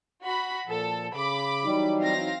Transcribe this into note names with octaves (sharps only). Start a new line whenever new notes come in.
F#4 B5
A#2 F3 A4
C#3 B5 D6
E3 F#3 G3 D#4
C4 F5 A#6